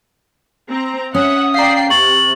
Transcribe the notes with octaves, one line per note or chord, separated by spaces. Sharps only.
C4 A#5
C#4 E5 F#5 D#6
D5 F5 G5 A#5 C7
C3 C#6 A6 F#7